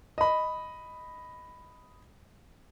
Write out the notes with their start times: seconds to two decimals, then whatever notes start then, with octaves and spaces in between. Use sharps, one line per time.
0.18 D#5 B5